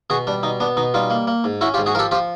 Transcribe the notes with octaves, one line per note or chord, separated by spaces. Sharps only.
B2 F#4 G#4
G3 D4
B2 D#4
B3 D4
B2 D#4
G3 D#4 F4
A#3
A#3
G#2
C#4 E4 F#4
F4 G4
G#2
F#4 G#4
F3 G4 A4 A#4
F3 F4 G4